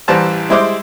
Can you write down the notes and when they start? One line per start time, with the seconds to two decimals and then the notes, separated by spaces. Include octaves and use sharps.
0.08 A1 E3 G3 C5 A5 A#5
0.49 G3 G#3 E4 C5 C6 D6